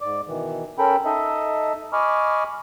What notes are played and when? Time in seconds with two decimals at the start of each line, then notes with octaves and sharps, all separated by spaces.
0.01 G#2 D5 D6
0.28 B2 D#3 E3
0.78 C#4 A4 A#4 G5 B5
1.05 D#4 A4 D#5 E5
1.93 D#5 G#5 B5 C#6 D6 F6